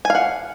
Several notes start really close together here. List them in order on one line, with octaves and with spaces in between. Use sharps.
G#5 F5 F#5